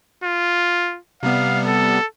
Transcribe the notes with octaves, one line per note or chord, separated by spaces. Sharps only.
F4
C3 G3 B3 F5
A4